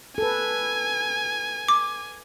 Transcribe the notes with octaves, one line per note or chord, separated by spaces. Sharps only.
A4 B4 G#5
D6